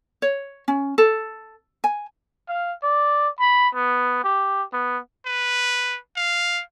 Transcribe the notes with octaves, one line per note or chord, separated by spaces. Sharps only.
C#5
C#4
A4
G#5
F5
D5
B5
B3
G4
B3
B4
F5